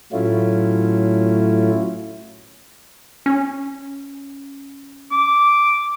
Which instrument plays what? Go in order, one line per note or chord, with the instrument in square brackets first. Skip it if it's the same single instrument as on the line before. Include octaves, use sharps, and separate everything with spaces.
[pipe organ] A2 F#3 A3 C#4 E4 F4
[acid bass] C#4
[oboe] D6